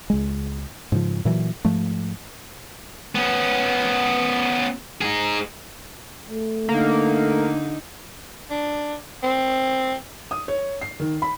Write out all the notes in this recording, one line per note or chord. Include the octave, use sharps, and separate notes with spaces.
C#2 G#3
G#2 C#3 F3
A#2 E3 F#3
G#2 F3 A3
B3 C#4
D#4 G#4
A3
D3 A#3 D#4
D4
C4
D#6
C#5
C7
D#3
B5